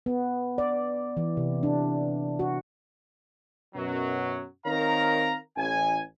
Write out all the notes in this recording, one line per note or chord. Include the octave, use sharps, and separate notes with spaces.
B3
D5
E3
C3
D4
F#4
F#2 B2 F#3
D#3 C4 A#4 C#5 F5 A#5
A1 G#5